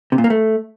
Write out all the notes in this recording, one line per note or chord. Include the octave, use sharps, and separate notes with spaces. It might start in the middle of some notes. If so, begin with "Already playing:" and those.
C3
A#2
A#3
A3